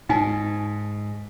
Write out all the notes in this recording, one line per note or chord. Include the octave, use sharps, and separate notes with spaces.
G#2 D#4 G#5